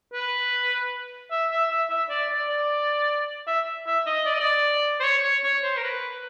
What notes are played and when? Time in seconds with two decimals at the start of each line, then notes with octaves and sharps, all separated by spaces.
0.13 B4
1.31 E5
1.51 E5
1.70 E5
1.90 E5
2.10 D5
2.29 D5
2.49 D5
3.47 E5
3.86 E5
4.06 D#5
4.26 D5
4.33 D#5
4.40 D5
5.00 C5
5.04 C#5
5.24 C#5
5.44 C#5
5.63 C5
5.77 A#4
5.83 B4